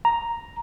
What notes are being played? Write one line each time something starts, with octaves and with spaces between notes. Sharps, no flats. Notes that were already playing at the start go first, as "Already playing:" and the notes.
A#5